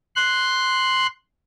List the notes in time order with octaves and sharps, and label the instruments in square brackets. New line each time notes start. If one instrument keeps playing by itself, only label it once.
[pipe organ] C6 F#6